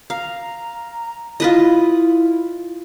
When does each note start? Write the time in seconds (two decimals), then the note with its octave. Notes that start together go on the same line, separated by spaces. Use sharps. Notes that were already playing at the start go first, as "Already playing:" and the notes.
0.10 F5 A#5
1.40 E4 F4 B4 D#5